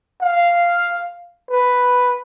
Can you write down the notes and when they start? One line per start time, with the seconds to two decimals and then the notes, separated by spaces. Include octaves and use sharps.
0.21 F5
1.51 B4